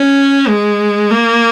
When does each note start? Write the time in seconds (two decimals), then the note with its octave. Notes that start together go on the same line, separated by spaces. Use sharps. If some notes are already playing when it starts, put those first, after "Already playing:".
Already playing: C#4
0.48 G#3
1.11 A#3